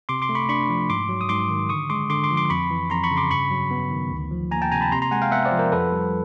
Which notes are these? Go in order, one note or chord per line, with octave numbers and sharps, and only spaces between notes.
C3 C6 D6
C6 D6
A3
B5 C#6
D4 B5 C#6
F3
G#2 C6 D6
F#3
D#6
G#2 C6 D6
D#3
D3 C#6 D#6
G#3 C6 D6
D3 C6 D6
C6 D6
F3
C6 D6
F2 B5 C#6
E3
F2 A#5 C6
B5 C#6
C#3
C6 D6
G2 B5 C#6
F#3
B3
D#3
D2
F3
A#3 G#5 A#5
G5 A5
C3 G#5 A#5
A5 B5
C3 A#5 C6
A#5 C6
G#3 F#5 G#5
F5 G5
B3 E5 F#5
C5 D5
F3
A#4 C5
F2 A4 B4
G3